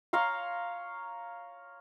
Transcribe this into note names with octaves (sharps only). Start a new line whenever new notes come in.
C#5 F5 A#5 C6